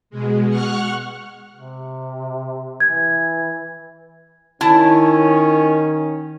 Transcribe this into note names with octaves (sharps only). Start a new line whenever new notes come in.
B2 G#3
F#5 C#6 F6 F#6
C3
E3 G#6
D#3 C#4 E4 A5